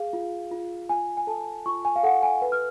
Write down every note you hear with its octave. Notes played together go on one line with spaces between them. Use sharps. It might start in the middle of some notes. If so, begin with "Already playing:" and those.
Already playing: G#4 F5
F4
F4
F4 G#5
G#5
A4 A5
F4 C#6
G#5
F5
A4 F#5
G#5
B4
F6